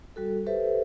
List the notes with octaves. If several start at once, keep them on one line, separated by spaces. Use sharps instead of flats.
G3 F#4 A4
G4 A4 B4 C5 E5